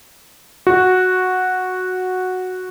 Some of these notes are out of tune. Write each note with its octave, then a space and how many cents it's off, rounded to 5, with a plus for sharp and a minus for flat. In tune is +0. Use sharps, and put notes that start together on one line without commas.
F#4 -5